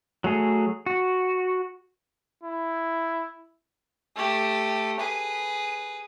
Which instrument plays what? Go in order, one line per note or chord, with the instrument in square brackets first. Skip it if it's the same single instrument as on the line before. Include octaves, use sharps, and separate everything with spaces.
[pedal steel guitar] F#3 A3 G#4
F#4
[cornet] E4
[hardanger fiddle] A3 G4
G#4 B4